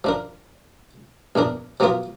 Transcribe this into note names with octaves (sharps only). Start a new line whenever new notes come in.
F3 D4 A#4
A#1 E2 D4 A#4
F3 F#3 A#3 B3 F4 A#4